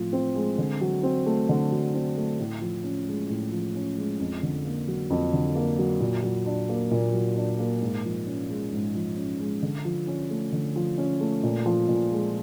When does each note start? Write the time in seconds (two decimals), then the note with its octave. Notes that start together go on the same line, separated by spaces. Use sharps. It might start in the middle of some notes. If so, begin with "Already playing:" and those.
Already playing: A2 F3 C4
0.13 C4
0.35 G#3
0.58 D3
0.81 F#3
1.03 C4
1.26 A3
1.49 D3
1.72 F#3
1.95 C4
2.17 A3
2.40 A2
2.62 F3
2.84 C#4
3.08 G#3
3.30 A2
3.52 F3
3.75 C#4
3.98 G#3
4.20 F2
4.43 D3
4.65 A#3
4.88 F#3
5.10 F2
5.33 D3
5.55 A#3
5.79 F#3
6.00 A#2
6.23 F#3
6.46 D4
6.69 A#3
6.91 A#2
7.14 F#3
7.36 D4
7.59 A#3
7.82 G#2
8.05 F3
8.27 C#4
8.49 G#3
8.73 G#2
8.95 F3
9.17 C#4
9.40 G#3
9.63 D3
9.85 F3
10.07 C#4
10.30 A3
10.53 D3
10.76 F3
10.98 C#4
11.21 A3
11.43 A#2
11.66 F3
11.88 A#2
12.12 G#3